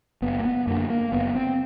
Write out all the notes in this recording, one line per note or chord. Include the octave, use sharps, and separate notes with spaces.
F#1 B3
A#3
B3
F#2 D3 A#3
A#3
F#1 B3
C4